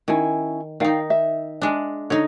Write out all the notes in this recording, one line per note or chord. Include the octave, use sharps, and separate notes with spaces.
D#3 C#4 E4 G#5
D#3 D#4 D5 F5 G5
E5
G#3 D4
D3 D#4 C#5